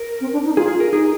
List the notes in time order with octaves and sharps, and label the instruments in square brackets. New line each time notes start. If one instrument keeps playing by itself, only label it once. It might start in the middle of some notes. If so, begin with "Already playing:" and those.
Already playing: [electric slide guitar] A#4
[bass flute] C4
D4
D#4
[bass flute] F4 [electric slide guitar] G#4
[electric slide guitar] G#4
A#4
[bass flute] D#4 [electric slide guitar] G#4